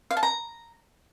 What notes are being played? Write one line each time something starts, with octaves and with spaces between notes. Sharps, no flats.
F5
A5
A#5